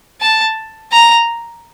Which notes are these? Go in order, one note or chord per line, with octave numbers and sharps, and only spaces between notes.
A5
A#5